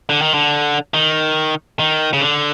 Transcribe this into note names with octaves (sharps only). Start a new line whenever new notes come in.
D3
D#3
D3
D#3
D#3
C#3
D3